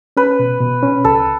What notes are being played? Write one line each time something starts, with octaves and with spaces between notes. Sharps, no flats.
C#4 B4
B2
B2
C#4
C#2 A4